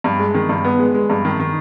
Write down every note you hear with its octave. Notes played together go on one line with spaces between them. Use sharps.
G2
G#3
D#3
G2
B3
G#3
G#3
G2
D#3
D#3